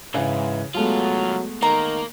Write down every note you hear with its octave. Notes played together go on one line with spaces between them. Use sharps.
G#2 C#3 E3
C2 F#3 G#3 A3 B3 F4
D#3 A#3 A#5